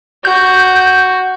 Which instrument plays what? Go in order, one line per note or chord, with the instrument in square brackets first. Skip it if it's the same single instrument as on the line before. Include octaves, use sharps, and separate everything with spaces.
[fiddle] F#4 [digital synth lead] G6